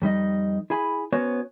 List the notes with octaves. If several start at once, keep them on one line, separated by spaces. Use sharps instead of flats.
F2 G3 D#4 D#5
E4 G#4 G#5 B5
B3 C#4 F#4 C5 C#5